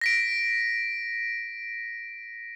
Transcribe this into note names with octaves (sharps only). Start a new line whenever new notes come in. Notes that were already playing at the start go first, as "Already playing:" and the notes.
A#6 B6 D7